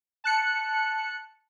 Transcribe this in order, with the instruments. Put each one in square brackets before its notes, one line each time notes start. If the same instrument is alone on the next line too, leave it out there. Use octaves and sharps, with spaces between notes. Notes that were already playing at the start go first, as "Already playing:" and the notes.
[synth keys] A5 F#6 C#7